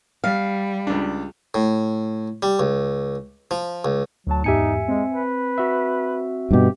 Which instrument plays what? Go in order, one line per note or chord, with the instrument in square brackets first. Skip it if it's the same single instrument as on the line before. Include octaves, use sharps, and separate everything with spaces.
[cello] G3 [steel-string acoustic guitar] F5
[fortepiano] C#2 D4
[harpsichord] A2
G3
C#2
F3
C#2
[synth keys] D2 A5 [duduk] F#3
[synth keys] E2 G#2 G4 [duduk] D#4 [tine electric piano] E5 G#5 C#7
[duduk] G#3 [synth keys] C4
[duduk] B4
[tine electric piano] F#4 E5
[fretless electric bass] G2 B2 [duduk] G4